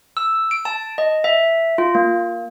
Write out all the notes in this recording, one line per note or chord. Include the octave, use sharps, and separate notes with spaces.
E6
D7
A5
D#5
E5
F4
A#3